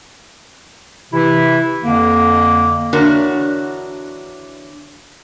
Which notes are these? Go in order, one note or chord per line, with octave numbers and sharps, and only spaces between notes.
C3 E3 E4
F2 D3 A#3
E2 D3 D4 F#4 A#4 C#5